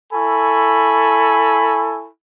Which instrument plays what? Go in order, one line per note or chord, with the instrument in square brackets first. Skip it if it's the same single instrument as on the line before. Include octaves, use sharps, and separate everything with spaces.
[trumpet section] E4 A4 G#5 B5 C#6